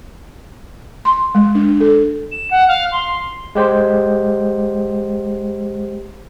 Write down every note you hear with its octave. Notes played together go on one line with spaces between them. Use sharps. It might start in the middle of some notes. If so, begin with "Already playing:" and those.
C6
G#3
D4
A4
E7
F#5
F5
C6
G#3 G4 C5